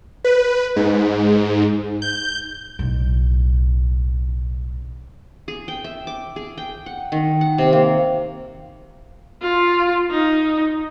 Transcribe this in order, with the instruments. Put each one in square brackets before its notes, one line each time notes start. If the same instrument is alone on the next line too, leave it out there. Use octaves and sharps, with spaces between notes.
[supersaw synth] B4
G#2
G6
[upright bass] B1 A2
[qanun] G#4
G5
E5
D6
G#4
G5
F#5
D#3
F#5
C3
A#3
[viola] F4
D#4